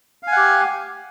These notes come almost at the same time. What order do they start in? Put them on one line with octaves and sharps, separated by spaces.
F5 G#5 F#5 G4